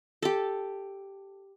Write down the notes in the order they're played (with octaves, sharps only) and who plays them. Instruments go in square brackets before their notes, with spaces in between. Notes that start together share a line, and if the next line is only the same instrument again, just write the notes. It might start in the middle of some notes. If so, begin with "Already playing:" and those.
[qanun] G4 A4